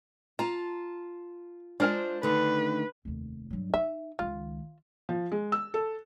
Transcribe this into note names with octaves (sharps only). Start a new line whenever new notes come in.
F4 A5 A#5
G#3 D4 F4 A#4 C5 G#5
D3 D#3 A3 B4
F1 D#2
G2 F#3
D#4 E5
C#2 D#3 F4
F3
G#3
E6
A4